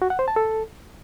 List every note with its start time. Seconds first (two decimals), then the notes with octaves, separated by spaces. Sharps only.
0.02 F#4
0.10 F#5
0.19 C5
0.28 A5
0.36 A4